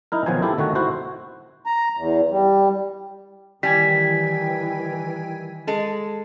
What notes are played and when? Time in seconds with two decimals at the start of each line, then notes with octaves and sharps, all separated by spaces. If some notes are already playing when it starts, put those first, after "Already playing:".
0.12 D#4 E4 A#4
0.26 B2 D#3 F3 F#3 C5 G#5
0.42 E4 G4 A4
0.58 D3 D#3 A3 F#4
0.75 E4 F#4 C5
1.66 A#5
1.97 E2
2.31 G3
3.63 D#3 E3 G3 G5 G#5 G#6 B6
5.67 G#3 A4